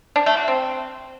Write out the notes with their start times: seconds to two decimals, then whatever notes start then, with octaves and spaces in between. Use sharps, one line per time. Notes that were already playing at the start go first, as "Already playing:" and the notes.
0.16 D4
0.26 A3
0.37 F#4
0.48 C4